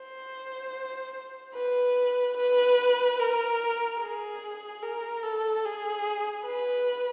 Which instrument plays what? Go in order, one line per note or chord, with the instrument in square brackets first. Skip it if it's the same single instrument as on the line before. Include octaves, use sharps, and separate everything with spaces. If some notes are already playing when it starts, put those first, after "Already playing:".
Already playing: [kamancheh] C5
B4
B4
A#4
G#4
A#4
A4
G#4
B4